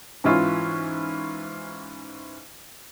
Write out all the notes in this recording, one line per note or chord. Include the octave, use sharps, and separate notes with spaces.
G#2 E3 C#4 E4 F4